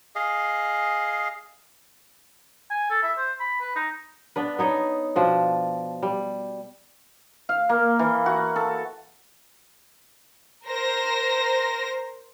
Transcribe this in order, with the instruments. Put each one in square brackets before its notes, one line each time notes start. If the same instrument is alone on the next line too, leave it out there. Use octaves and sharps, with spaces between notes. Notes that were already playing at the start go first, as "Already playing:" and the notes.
[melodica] G#4 D#5 F5
[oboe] G#5
A4
E5
C5
B5
B4
D#4
[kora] B3 D4 B4
B3 D#4 C#5 D#5
B2 F3 D4
G3
[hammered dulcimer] F5
A#3
E3
F#4
A4
[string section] A#4 C5 A#6